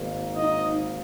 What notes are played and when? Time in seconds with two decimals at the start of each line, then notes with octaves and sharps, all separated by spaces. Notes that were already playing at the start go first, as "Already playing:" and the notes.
Already playing: G#1 G#2 D#3 A#3
0.37 D#4 D#5